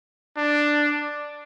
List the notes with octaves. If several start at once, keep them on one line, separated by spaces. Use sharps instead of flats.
D4